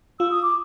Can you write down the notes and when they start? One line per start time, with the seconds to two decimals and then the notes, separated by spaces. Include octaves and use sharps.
0.20 F4 E6
0.31 D#6
0.42 D6